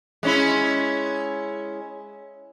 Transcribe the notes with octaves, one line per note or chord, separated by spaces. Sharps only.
G#3 C#4 E4